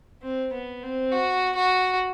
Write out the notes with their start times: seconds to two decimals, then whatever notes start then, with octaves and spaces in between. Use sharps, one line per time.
0.23 C4
0.53 B3
0.83 C4
1.12 F#4
1.56 F#4